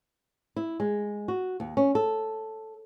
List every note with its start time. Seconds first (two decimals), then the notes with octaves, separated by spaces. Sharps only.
0.56 E4
0.80 G#3
1.28 F#4
1.60 D#2
1.77 C#4
1.95 A4